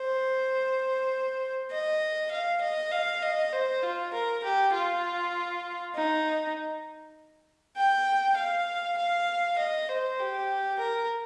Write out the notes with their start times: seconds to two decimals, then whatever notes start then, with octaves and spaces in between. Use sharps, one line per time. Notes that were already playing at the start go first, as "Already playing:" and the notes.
Already playing: C5
1.71 D#5
2.32 F5
2.62 D#5
2.92 F5
3.22 D#5
3.53 C5
3.83 F4
4.13 A#4
4.44 G4
4.74 F4
5.96 D#4
7.77 G5
8.37 F5
8.98 F5
9.59 D#5
9.89 C5
10.20 G4
10.80 A#4